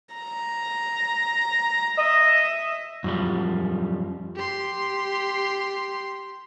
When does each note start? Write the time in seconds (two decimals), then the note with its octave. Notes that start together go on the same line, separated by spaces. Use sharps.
0.14 A#5
1.99 D#5 E5
3.04 F#2 F3 G3
4.35 G4 C6